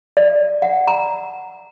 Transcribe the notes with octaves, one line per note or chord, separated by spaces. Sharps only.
D5
F#5
A#5